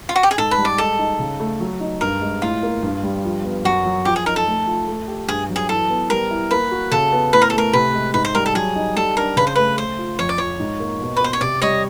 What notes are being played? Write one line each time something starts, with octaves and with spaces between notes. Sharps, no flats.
F4
F#4
G4
G#4
G#2 A4
B4
G3
D5
G#3 A4
D#4
C#3
A3
F#3
D#4
G2 A#4
G#3
A2 F4
A#3
G2
G3
F3
B3
F#2 F#4
F#3
F3 G4
G#4
D#4 A#4
A4
A3
F4
A3
G4
G2 G#4
F#3
G#4
E3 A4
B3
G3 A#4
E4
A#3 B4
F#4
C#3 A4
B3
A2 B4
A#4
A4
A3 A#4
C3 B4
G#3
G#2 B4
C5
G3 A#4
A4
F#3 G#4
D#4
G3 A4
D4 A#4
C#3 B4
C5
A3 B4
A3 C5
F4
F2 C#5
D5
F3 C#5
G#2
A#3
B2
B4
B3 C5
C#5
C3 D5
G3 C#5 D#5